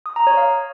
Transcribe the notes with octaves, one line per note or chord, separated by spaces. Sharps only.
D#6
A#5
C#5
F5